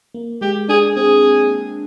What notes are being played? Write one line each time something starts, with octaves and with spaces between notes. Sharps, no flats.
A#3
G#3 G4
D4 G#4
C4 G#4